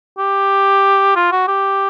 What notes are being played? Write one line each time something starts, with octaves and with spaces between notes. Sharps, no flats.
G4
F4
F#4
G4